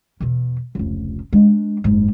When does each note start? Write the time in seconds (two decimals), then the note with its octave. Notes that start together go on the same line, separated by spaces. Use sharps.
0.20 E2 B2
0.75 F1 C#2
1.33 G#3 D4
1.84 F#1 G#2